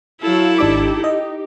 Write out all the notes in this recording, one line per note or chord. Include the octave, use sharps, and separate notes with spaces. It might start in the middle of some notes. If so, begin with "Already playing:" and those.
F#3 E4 A4 F5
G#1 D4 D#4 G4 D6
D#5